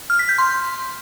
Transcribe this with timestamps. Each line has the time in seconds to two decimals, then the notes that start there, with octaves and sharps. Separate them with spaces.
0.10 F6
0.19 B6
0.29 G6
0.38 C6